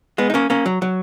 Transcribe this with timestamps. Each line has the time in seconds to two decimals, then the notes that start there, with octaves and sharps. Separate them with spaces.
0.18 G#3 B3
0.30 D#4
0.34 A#3 C#4
0.50 A#3 C#4
0.66 F#3
0.82 F#3